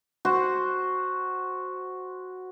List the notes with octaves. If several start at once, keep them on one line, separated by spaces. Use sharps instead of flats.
F#4 C5